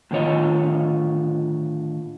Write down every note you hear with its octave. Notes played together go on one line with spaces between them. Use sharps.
A2 D3 D#3 F4 C#5 D#5